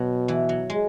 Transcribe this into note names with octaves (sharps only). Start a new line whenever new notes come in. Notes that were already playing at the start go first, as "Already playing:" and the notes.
Already playing: B2 F#3
E3
F#3
G#3